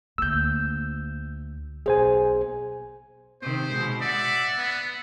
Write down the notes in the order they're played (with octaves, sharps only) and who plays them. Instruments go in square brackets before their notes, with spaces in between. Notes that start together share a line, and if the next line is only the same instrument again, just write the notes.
[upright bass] D2 A#3 [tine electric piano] E6 G6
[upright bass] B1 [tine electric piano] G#4 C5 G#5
[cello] C3 D#3 [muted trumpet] C5
[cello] B2 G#3
[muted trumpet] D5 [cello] E5 F#5
[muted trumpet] B3